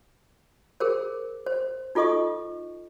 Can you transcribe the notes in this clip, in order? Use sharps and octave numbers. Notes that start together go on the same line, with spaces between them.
G#4 A#4 C5
C5
D#4 F4 A4 D#5 C#6 D#6